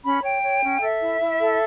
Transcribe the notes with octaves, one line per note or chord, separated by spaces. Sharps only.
C#4 B5
C#5 G5
C#5
C#4
F#5
A4 E5
E4
E4
A4